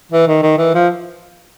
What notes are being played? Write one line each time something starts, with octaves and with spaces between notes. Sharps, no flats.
E3
D#3
D#3
E3
F3